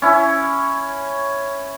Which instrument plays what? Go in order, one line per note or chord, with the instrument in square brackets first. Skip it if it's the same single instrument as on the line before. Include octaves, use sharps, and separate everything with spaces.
[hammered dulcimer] C#4 E4